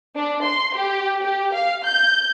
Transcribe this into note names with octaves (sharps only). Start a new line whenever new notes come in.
D4
C6
G4
G4
F5
G6